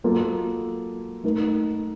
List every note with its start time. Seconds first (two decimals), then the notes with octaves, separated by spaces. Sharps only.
0.04 F#3 A#3 F4 A4
1.24 A3 D#4 A#4